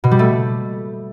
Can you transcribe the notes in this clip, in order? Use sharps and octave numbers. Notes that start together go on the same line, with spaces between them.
B2
G3
A3